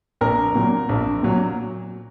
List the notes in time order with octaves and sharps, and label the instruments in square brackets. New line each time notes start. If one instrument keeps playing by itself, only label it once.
[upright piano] A#1 A#4
A#2 F#3
A#1
A#2 F#3